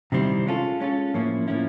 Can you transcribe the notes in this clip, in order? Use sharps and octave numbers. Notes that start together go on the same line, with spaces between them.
C3 D#3 G3 C4 E4
G#3 C#4 F4 A4
G#3 C#4 F4 A4
A2 F3 A#3 C#4 E4
A2 F3 A#3 C#4 E4